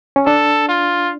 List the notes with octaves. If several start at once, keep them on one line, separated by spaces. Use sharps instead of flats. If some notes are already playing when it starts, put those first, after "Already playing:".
C#4
D4 A4
F4